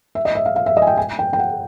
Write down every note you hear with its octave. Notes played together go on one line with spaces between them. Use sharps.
E5
D#5
E5
F5
F5
E5
D#5
G#5
G5
G#5
G5
G5
F#5